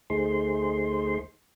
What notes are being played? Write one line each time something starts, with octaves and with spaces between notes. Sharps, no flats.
D2 A3 D#4 G#4 C5 C6